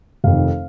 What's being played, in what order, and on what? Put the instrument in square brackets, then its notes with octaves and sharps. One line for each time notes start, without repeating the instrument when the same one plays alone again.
[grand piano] F1 F2 D#3 F5